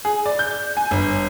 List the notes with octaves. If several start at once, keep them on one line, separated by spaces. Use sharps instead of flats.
G#4
D5
G6
G#5
G1